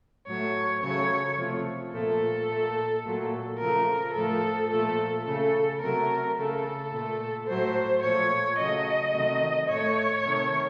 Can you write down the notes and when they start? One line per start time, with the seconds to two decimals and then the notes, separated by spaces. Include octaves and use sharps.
0.27 A2 F#3 A3 C#5
0.82 C#3 F#3 A3 C#5
1.38 C3 F3 A3
1.93 A#2 F3 A3 A4
2.48 A#2 A3
3.05 A#2 F#3 A3
3.59 C#3 F3 A3 A#4
4.15 A2 F3 A3 A4
4.70 A#2 F3 A3 A4
5.25 C#3 A3 A4
5.81 C3 F#3 A3 A#4
6.37 C#3 A3 A4
6.92 A#2 A3
7.48 A2 F#3 A3 C5
8.03 A#2 F3 A3 C#5
8.59 C#3 F#3 A3 D#5
9.14 C3 D#3 F#3 A3
9.69 A2 A3 C#5
10.25 C3 D#3 A3